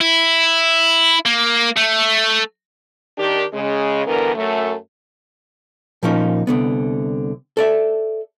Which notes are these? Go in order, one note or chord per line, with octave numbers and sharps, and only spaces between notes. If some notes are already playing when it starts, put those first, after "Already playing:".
E4
A#3
A3
D#3 D4 G4
C#3 G#3
G2 D3 E3 B3 A#4
F#2 A3
A#2 F3 A#3 C#4 D#4
C2 D3 B3
A4 D5 E5